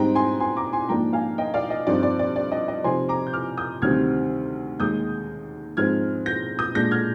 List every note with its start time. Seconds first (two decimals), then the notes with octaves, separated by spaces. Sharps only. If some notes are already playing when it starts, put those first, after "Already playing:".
Already playing: G#2 G3 C4 D#4 G5 A#5
0.15 G#5 C6
0.40 G#5 C6
0.57 A#5 D6
0.73 G#5 C6
0.89 G#2 F3 A#3 D4 G5 A#5
1.13 F5 G#5
1.38 D#5 G5
1.54 D5 F5
1.70 D#5
1.87 G2 F3 C4 D#4 D5
2.03 D5
2.19 D5
2.36 D5
2.52 D#5
2.68 D#5
2.84 C3 F3 C4 D#4 G#5 C6
3.09 A#5 D6
3.27 G6
3.33 D6 F6
3.57 D#6 G6
3.82 D2 C3 D#3 G3 C4 F6 G#6
4.80 D#2 D#3 G#3 D#4 D#6 G6
5.77 G#2 F3 G#3 C4 F6 G#6
6.26 G6 A#6
6.59 D#6 G6
6.75 A#2 G#3 D4 G6 A#6
6.91 F6 G#6